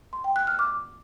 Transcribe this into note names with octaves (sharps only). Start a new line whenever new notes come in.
C6
G5
F#6
F6
D6